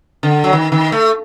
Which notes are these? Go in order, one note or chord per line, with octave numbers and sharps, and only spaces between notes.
D3
F#3
D#3
D#3
A3